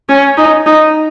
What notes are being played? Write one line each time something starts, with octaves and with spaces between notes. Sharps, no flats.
C#4
D#4
D#4